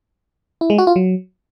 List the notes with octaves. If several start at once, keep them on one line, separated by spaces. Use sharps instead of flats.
E4
G#3
F#4
F4
F#3